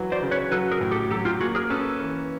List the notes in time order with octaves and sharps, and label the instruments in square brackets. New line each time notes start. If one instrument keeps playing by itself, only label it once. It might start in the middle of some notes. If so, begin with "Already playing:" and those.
Already playing: [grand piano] E3 F#3
[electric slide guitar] C5 D5
[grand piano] C#3
[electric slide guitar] B4 C#5
[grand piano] F#3 [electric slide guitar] A4 B4
[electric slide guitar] G#4 A#4
[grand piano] A2
[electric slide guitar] G4 A4
[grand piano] F#3 [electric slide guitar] G4 A4
[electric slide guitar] F4 G4
[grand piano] A#3 [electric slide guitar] F#4 G#4
[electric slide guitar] G#4 A#4
[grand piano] C#4 [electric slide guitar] A4 B4
[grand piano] E3